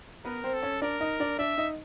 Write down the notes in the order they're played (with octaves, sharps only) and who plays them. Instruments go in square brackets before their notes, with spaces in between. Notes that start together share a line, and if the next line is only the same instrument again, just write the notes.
[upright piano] B3 B4 [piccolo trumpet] A#4
[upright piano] C4 C5
[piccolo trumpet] A4
[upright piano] C#4 C#5
[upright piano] D4 D5 [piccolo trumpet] A#4
[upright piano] D#4 D#5
D4 D5
[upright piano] D4 D5 [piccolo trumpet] E5
[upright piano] D#4 D#5